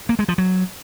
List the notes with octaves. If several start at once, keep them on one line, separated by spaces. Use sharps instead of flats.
A#3
G#3
F3
F#3